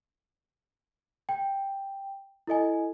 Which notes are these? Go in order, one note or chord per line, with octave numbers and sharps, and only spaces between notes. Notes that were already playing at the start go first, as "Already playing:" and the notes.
G5
E4 A4 D#5 G#5